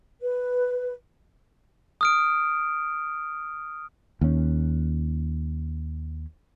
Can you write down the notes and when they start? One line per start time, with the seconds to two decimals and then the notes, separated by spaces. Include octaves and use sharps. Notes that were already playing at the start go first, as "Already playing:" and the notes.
0.22 B4
2.01 D#6 F6 D7
4.21 D#2 C#4